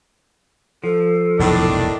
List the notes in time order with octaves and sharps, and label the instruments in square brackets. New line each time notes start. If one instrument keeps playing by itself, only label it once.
[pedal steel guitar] F3 [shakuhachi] A4
[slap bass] F1 B1 F2 [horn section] A2 D#3 D4